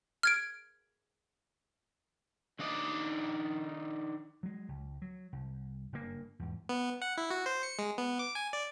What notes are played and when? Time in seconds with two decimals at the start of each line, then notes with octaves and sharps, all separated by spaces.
0.23 F6 G#6 D7
2.59 D#3 D4 D#4 D5 D#5
4.43 F#3 G#3
4.68 C#2
5.02 F#3
5.32 C2
5.92 F#1 G2 C3 A#3
6.39 E2 G#2
6.69 B3
7.02 F#5
7.17 E4
7.31 F#4
7.46 C5
7.63 C#7
7.79 G#3
7.98 B3
8.19 D6
8.35 G#5
8.53 D5